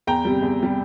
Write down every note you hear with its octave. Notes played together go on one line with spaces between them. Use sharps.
E2 G5 A#5
C3 G3
E2
C3 G3